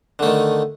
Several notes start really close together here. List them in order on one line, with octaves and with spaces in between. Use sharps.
D3 A3 D#3